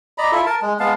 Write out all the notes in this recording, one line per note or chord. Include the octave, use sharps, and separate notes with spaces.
D5 D#5 A#5 B5
E4 F4 A4 E5
A#4 A5
G#3
G#3 B3 F5 A5